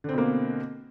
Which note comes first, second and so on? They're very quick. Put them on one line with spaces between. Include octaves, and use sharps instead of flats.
D3 C4 B2 A#3